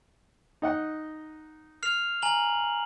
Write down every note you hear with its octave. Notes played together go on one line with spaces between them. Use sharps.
D#4 D#5 F#5
F6 C7 F7
G#5 A#5 F#7